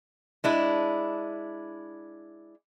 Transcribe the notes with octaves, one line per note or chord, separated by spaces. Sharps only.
G#3 D4 E4